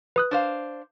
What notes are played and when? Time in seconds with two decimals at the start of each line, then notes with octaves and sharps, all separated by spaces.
0.16 B4 D#6 F#6
0.31 D4 C5 F5